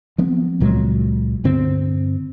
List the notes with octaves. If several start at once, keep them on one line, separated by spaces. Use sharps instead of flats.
F3 B3 C4
C#2 A#2 F#3 G#3
G2 D3 C4